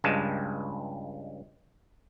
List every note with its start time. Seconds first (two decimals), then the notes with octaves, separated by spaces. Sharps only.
0.04 C#2 G2 G3 G#3 A5